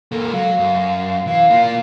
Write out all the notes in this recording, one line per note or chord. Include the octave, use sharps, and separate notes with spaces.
C#2 A#3 A4
F#3 F5
F#2
E3 F5
A#3 F4